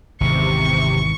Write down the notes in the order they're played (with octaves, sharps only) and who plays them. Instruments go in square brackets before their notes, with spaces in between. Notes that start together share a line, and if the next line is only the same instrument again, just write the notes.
[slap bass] G#1 E2 [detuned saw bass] C3 [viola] C#6